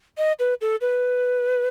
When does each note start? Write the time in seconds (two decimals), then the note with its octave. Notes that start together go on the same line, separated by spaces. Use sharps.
0.18 D#5
0.39 B4
0.61 A4
0.81 B4